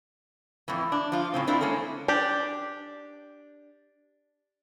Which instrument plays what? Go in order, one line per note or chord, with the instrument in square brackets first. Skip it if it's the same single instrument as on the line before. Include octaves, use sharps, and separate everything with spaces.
[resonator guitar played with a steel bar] F2 A2 E3
D4
F3 F4
A2 C#3 C4
C4 D4 E4 F4 A#4
G#3 A#3 C#4 G#4 A4
[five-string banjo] D4 G4